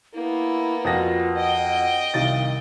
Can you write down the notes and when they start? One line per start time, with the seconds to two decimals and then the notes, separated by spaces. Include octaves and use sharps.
0.14 A#3 B3 E4
0.84 F2 F4 F#4 A#6
1.36 D#5 F#5 G5
2.14 C2 D#3 F5 A6